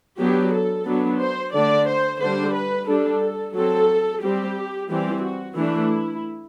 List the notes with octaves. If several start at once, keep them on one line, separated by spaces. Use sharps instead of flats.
F#3 B3 D4 G4
A4
F#3 B3 D4
C5
D3 A3 D4 D5
C5
D3 G3 D4 C5
B4
G3 D4 A4
F#3 C4 A4
G3 C4 G4
E3 G3 C4 G4
F#4
E3 A3 D4 E4